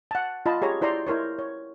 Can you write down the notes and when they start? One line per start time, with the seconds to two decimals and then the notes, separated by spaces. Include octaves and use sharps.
0.11 F#5 A5
0.46 F4 D#5 A5 B5
0.62 G4 G#4 C#5 A#5
0.81 E4 C5 D5 A#5 C6
1.07 E4 A#4 C5 C#5
1.39 C#5